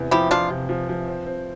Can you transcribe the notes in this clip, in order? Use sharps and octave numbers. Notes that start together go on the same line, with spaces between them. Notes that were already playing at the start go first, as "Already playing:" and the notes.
Already playing: E2 C3
F3 E4 G4
F3 D4 F4
C3
F3
F3
C4
C4